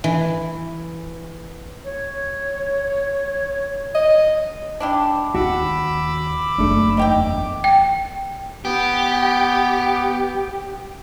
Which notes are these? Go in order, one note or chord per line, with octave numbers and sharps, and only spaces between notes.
E3
C#5
D#5
D4 E4 G4
D#2 F#4 B5 D6 E6
F#1 A3 D4
E2 D#4 G4 G5 D6
G5
B3 G4